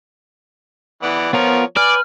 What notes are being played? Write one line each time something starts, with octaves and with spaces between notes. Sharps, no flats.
E3 B3 D5
F3 B3 F4 A#4 C#5
B4 D5 G#5 F6